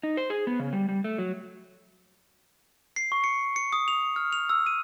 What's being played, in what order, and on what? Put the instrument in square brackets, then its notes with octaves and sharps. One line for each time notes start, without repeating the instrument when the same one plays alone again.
[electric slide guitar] D#4
C5
G#4
B3
C#3
G3
G3
A3
F#3
[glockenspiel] C7
C#6
C#7
C#7
D#6
F7
F6
F7
E6
D#7